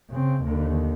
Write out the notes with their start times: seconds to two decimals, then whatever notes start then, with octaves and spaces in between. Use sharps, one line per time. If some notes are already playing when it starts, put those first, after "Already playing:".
0.10 C#3 C4
0.44 D#2 D3